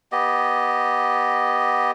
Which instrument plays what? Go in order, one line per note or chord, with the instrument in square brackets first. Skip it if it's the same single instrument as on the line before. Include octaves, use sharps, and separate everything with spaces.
[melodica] B3 G4 D#5